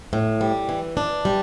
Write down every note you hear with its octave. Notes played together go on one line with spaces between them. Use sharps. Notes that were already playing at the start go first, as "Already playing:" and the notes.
A2
G3
E3
D4
G3